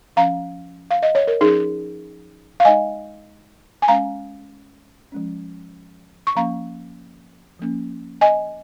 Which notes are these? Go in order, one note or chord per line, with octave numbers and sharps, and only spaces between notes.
F3 C#4 F5 A#5
F5
D#5
C#5
A#4
F3 C#4 D#4 G#4
F5
G#3 D#4 D#5 G#5
G#5
G#3 C#4 F5 A#5
F3 G#3 C#4
C#6
F3 A#3 C#4 F5 A#5
F3 A#3 C#4
D#5 G#5